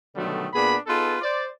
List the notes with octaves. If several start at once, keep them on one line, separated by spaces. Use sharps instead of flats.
B2 D3 D#3 F#3 G3 A3
A#2 B3 D4 G#4 B5
B3 D#4 F4 G#4 A4 B4
C5 D5